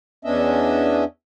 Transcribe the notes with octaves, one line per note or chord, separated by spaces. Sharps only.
E2 B3 C#4 D4 D#5 E5